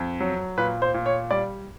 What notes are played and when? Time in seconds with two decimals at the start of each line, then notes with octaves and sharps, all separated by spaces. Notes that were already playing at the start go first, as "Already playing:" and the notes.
Already playing: F2
0.20 F#3
0.57 A#2 B4
0.82 C5
0.94 A#2
1.06 C#5
1.31 G3 D5